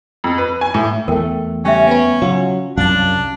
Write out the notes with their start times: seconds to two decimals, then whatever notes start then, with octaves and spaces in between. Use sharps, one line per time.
0.24 F2
0.38 B4
0.61 G#5
0.74 A2
1.08 E2 A3 A#4 G5
1.65 C#3 G3 C#4 E5 G5
1.87 B3 B4
2.22 C#3 F#3 F4
2.77 C2 F#2 D4 F5 A5